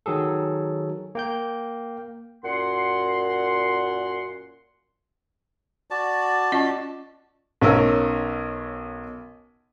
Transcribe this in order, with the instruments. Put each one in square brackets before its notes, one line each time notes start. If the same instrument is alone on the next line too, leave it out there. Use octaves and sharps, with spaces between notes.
[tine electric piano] D#3 F#3 G#4 A4
A#3 G5 G6
[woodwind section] F#2 A#2 F#5 C6
[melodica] F#4 D5 A5
[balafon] C#4 F4 D#5
[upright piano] B1 C#4 A#4 E6